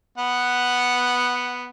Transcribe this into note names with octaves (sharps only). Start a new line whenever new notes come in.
B3 F#5